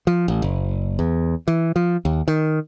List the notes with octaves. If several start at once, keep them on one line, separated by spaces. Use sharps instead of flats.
F3
A1
F#1
E2
E3
F3
D#2
D#3